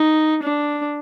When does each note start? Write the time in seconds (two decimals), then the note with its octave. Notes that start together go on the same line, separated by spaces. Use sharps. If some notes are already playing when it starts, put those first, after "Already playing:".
Already playing: D#4
0.43 D4